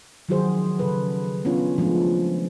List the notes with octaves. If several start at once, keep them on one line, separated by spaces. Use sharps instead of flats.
D#3 F3 F#3 F#4 G#4 C5
C#3 A4 B4
B3 C#4 D4 F4 C#5
F3 G#3 A3 B3 D4